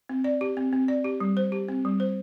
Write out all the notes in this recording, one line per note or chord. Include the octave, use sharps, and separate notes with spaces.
C4
D5
G4
C4
C4
D5
G4
G3
C5
G4
C4
G3
C5